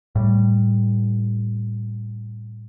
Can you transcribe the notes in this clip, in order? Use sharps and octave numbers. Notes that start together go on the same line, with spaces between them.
A2 G3